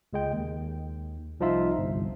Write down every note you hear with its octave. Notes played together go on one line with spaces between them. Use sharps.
C#2 G#3 G5
D#2
C2 F3 D#4 F4 E5
G1 C2